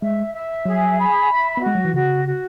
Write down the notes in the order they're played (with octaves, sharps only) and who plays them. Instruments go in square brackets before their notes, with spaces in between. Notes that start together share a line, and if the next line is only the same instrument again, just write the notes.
[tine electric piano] G#3 [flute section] E5
[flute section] E5
[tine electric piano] F#3 [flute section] G#4
[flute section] B5
E5
[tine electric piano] B3 [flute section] F#4
[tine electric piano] G#3
F#3
E3
[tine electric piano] C#3 [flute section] F#4
[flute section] F#4